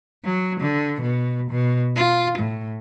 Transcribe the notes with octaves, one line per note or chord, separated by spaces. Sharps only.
F#3
D3
B2
B2
F4
A2